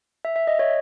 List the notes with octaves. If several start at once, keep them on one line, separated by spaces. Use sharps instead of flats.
E5
E5
D#5
C#5